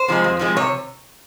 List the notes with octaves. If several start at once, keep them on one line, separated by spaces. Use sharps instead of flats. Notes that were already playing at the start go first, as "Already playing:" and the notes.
Already playing: C5
C3 F3 G#3
F2
C3 F3 G#3
C3 C#5